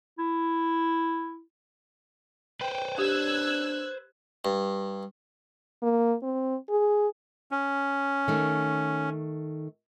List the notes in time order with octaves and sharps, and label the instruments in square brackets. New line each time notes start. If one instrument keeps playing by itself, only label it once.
[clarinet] E4
[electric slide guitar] B4 C5 [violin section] G5
[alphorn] D4 [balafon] G4 [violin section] E6 F#6 G#6
[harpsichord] G2
[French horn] A#3
C4
G#4
[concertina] C#4
[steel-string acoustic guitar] D#3 A3